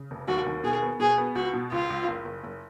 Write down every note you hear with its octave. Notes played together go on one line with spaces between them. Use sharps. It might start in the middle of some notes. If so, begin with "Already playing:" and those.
Already playing: C#3
F1
D#2 F#4
D#2
B2 G#4
B3
B2 G#4
B3
C#2 F#4
B2
C#2 F4
C#2
F#1
F#1
F#1